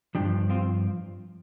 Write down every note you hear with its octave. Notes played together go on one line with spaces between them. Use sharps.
G2 F3 D4 G4
C4 F4